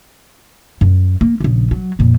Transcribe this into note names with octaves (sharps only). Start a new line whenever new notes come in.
F#2
A#3
A#1 C#3
F#3
F2 A#2